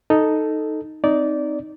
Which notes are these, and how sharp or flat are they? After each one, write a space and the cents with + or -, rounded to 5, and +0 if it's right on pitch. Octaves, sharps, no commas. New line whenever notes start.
D#4 +0 A4 +0
C4 -5 D#4 +0 D5 -15